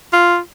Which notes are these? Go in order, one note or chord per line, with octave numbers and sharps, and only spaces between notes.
F4